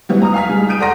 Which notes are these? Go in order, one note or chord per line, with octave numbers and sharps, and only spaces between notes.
E3 F#3 G3 B3
A#5 D#6 F6
F5 G#5 F6 B6
G3 G#3
D#6 G6 D7 D#7
A4 D5 F#5 A#5 C6 A#6